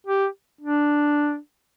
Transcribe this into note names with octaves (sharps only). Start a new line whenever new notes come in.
G4
D4